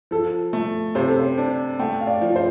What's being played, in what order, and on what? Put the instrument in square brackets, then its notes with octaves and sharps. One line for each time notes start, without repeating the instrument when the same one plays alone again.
[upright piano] F3 [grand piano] A4
[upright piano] A3
[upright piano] C3 [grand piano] C5
[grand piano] A4
C5
[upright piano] D4
[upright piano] A3 [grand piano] G5
[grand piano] F5
D5
[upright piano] F3
[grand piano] C5